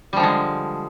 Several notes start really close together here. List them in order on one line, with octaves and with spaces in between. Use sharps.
G3 F3 D3 G#3